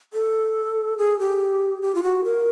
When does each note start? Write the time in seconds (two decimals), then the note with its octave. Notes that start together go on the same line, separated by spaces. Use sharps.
0.13 A4
0.98 G#4
1.19 G4
1.82 G4
1.95 F4
2.03 F#4
2.24 A#4